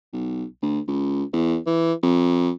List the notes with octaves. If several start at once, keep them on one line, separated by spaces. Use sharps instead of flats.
B1
D2
C#2
E2
E3
F2